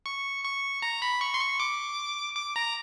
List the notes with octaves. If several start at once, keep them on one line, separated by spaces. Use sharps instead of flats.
C#6
C#6
A#5
B5
C#6
C6
C#6
D6
D6
A#5